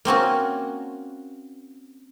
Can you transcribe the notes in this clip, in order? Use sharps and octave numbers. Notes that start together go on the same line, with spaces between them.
A#3 C4 C#4 F#4